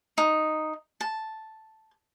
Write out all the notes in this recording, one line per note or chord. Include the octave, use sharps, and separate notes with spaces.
D#4
A5